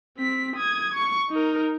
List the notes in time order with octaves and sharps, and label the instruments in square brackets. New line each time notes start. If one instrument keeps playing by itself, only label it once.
[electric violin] C4 B6
D#6 G#6
C#6
D#4 A#4